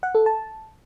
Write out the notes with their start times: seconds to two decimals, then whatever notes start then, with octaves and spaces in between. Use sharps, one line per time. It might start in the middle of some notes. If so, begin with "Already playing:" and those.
0.03 F#5
0.15 A4
0.26 A5